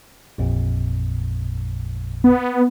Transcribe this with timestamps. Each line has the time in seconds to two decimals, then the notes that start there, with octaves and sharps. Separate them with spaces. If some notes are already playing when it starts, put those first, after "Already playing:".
0.38 A1 F2 A#2
2.24 B3